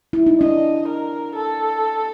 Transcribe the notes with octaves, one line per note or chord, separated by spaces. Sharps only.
E4
D#4
D4 D#5
A#4
A4